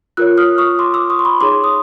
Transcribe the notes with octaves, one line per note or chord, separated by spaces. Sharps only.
F4 A#4 C#5 E6 F#6
D#6 F6
C#6 D#6
C6 D6
D6 E6
C#6 D#6
C6
B5 C#6
D#4 G#4 C#5 C6 D6
D#6